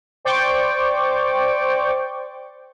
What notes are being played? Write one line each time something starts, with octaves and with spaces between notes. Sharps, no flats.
C5 D5 G5 C#6 D6